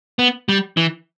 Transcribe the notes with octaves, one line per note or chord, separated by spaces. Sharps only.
B3
G3
E3